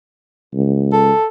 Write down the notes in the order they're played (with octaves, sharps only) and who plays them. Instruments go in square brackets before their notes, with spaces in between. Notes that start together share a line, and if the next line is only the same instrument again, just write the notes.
[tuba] C#2
[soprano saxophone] A4